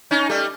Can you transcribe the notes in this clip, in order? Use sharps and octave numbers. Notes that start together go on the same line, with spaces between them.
C#4 D#4
G3 A3